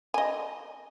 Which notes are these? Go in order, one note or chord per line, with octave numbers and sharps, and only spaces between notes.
D#5 G#5